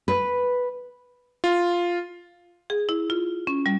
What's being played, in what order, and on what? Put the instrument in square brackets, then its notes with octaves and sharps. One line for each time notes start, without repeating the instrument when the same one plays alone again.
[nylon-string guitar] B4
[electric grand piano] F4
[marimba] G#4
E4
F4
C#4
G3